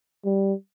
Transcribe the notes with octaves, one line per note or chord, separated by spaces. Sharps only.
G3